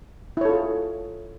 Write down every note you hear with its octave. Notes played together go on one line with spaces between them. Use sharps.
E4 F4 G#4 A4 C#5